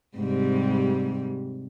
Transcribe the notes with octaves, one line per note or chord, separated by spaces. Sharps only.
G#2 C3 G3